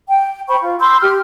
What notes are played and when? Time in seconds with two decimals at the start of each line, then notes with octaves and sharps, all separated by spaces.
0.09 G5
0.48 C5 G5 B5 C#6
0.60 F4
0.80 B5 C6 E6 G6
1.02 G4 G5 F6